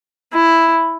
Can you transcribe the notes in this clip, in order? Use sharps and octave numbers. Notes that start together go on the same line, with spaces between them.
E4